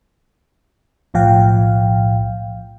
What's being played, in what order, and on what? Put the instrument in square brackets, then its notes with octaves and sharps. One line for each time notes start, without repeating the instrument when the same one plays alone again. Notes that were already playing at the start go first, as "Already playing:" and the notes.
[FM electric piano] B1 A2 F3 F5 G5